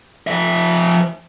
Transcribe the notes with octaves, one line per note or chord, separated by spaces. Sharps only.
F3 E5